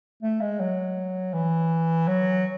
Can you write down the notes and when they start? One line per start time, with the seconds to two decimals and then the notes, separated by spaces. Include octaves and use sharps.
0.22 A3
0.41 G#3
0.60 F#3
1.33 E3
2.08 F#3